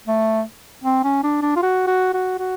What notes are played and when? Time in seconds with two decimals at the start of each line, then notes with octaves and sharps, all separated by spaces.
0.07 A3
0.84 C4
1.04 C#4
1.23 D4
1.42 D4
1.56 F4
1.62 F#4
1.87 F#4
2.14 F#4
2.39 F#4